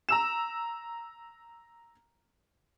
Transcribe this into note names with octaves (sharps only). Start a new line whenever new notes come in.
A#5 E6 E7